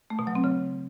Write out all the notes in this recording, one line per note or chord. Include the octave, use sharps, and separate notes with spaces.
A3
B2
F#3
C4
C#3